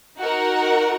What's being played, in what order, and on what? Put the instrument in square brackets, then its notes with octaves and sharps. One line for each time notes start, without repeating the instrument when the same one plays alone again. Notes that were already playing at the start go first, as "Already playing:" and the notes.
[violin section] D#4 F#4 A#4 F#5